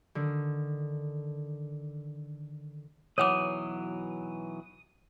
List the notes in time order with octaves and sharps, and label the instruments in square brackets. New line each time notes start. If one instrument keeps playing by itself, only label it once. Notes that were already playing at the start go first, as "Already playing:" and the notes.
[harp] D3 D#3
[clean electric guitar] B1 E3 F#3 [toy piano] C#5 F#5 D6 [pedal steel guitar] D#6